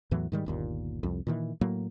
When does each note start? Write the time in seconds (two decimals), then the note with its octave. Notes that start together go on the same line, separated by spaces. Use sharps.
0.11 E2 A2 E3 F#3
0.32 G#2 D#3 G3
0.46 G1 D#2 A#2
1.03 C2 F2
1.27 A#2 D#3 E3
1.61 A2 F#3 A#3